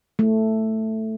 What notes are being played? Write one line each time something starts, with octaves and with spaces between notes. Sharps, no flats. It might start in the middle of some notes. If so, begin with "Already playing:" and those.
A3